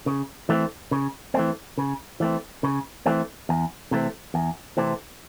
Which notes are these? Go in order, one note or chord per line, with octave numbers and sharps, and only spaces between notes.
C#3
E3 A3 C4
C#3
E3 A3 C4
C#3
E3 A3 C4
C#3
E3 A3 C4
E2
C3 E3 A3 C4
E2
C3 E3 A3 C4